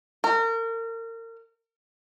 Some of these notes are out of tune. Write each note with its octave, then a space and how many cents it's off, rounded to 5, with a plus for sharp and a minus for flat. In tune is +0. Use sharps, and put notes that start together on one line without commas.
A#4 -35